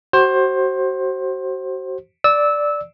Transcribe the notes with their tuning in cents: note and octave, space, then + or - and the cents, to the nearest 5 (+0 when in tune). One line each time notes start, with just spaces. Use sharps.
F#4 +35 C5 +20
D5 +0 E6 -20